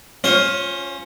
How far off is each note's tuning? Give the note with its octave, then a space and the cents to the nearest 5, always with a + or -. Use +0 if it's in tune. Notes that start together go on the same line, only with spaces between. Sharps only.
C#4 +0 F4 +5 C5 +30